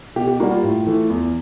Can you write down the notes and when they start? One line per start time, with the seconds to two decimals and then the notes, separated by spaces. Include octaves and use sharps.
0.16 B2 G4
0.27 G4
0.40 G3 A#3 F#4
0.51 F4
0.63 A2
0.86 E3 A3
1.10 E2